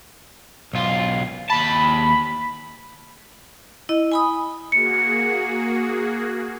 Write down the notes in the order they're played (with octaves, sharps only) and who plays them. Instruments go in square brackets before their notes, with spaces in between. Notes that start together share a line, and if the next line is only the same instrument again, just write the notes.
[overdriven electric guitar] B1 F4
[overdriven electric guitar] D#2 A5 [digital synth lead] B5
[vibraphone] E4 D#5
G#5 B5 D#6
[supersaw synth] A#3 F#4 G#4 [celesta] C#7